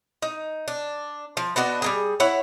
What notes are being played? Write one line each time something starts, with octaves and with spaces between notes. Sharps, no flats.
D#4
D4
F3
B3 D4 F#4 D#5
G3 A#3 G#4
E4 C#5 F#5